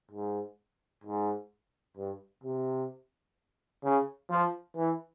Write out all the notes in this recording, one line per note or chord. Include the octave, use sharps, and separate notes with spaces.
G#2
G#2
G2
C3
C#3
F3
E3